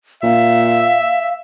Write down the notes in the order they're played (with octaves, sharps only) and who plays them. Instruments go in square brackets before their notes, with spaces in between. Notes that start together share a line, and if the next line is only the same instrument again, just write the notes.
[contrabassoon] A#2 [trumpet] E5 [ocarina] F5